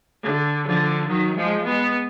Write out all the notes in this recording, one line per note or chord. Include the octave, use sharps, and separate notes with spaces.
D3
D3 F3
D#3 F#3
F3 G#3
G#3 B3